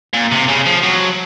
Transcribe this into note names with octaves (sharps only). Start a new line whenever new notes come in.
A#2
C3
C#3
F3
F#3